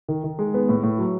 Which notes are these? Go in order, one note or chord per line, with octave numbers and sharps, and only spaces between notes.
D#3
D#3
G#3
B3
A2
A2
F#3